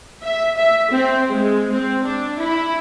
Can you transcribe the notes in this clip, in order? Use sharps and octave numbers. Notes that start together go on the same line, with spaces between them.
E5
E5
C4
G#3
C4
D4
E4